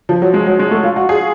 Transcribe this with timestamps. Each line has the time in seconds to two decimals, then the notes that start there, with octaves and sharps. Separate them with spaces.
0.09 F3
0.22 F#3
0.34 G#3
0.46 F#3
0.59 G#3
0.71 A3
0.84 F4
0.96 F#4
1.09 G#4